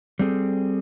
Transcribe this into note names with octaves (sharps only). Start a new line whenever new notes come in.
G3 C4 G#4 A4